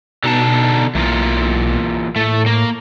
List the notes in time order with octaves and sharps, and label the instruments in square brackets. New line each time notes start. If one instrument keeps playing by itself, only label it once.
[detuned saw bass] B2 [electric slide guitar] D3 D#4 A5
[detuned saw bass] B1 [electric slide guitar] E3 A#3 F4
[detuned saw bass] A2 [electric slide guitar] A3
[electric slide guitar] A#3